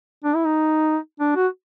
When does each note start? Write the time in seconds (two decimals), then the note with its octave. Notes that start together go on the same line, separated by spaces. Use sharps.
0.24 D4
0.35 E4
0.45 D#4
1.20 D4
1.36 F#4